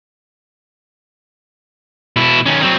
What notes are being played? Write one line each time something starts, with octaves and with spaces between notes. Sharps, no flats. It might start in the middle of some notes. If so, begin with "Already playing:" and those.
B2 E4
D#3 C#4
F#3 C4